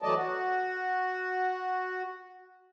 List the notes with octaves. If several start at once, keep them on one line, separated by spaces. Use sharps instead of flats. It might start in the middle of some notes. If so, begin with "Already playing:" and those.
E3 F#3 A3 D5 D#5 A5
F#4